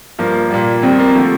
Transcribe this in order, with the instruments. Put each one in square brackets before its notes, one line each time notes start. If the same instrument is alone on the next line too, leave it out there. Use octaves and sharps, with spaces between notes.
[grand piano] G2 F3 A#3
A#2 G3
F2 D#3 G3 C4
A#3
D3 F3 A3